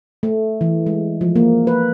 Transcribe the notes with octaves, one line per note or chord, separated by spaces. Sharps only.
A3
E3
G#3
F3
A#3
B4